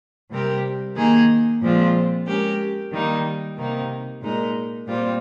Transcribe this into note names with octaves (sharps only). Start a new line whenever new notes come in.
C3 G3 C4 G4 A#4
D#3 A#3 D#4 G#4
A#2 F3 G#3 C4 F4
G#3 C#4 G4 A#4
D#3 G3 A#3 D#4
C3 D#3 A#3 D#4
A#2 G#3 D#4 A#4
A#2 G3 C4 F4